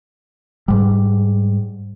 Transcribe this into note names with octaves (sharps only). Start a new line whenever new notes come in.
G#2 G3